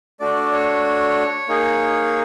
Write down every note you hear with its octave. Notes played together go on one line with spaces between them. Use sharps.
A3 D4 F#4 D5
C#5
A#3 D#4 G#4